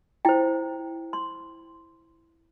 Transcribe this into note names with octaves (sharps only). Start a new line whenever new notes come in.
E4 C5 G5
C6